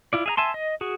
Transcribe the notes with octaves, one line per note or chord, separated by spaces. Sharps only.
E4 F4 D5
G#4 E5 A#5
E5 G#5 A5 C6
D#5
F#4 G#4